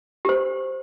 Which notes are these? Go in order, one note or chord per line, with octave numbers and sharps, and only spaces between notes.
G4 C5